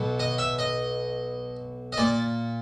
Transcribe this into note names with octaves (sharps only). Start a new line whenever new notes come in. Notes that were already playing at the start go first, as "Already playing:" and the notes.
Already playing: B1 B2
D#5
E5
D#5
D#5
A#2 D5